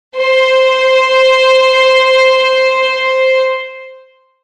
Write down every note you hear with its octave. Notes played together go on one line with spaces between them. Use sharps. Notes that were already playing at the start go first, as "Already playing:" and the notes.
C5